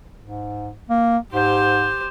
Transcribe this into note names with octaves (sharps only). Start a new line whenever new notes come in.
G#2
A#3
G#2 G4 C5